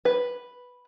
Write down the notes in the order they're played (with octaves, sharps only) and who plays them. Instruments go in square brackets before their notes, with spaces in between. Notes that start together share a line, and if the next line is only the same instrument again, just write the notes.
[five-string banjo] B4